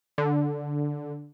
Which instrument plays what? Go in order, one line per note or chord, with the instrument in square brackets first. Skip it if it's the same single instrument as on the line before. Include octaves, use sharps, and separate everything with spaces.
[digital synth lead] D3